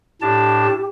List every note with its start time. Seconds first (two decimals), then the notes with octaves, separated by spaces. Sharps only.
0.22 A2 D4 G4 A5